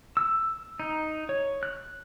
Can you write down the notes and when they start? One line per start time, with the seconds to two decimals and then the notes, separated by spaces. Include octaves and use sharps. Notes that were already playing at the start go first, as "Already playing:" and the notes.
0.17 E6
0.80 D#4
1.29 C#5
1.63 F#6